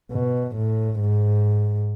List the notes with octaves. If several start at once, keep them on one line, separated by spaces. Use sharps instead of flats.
B2
A2
G#2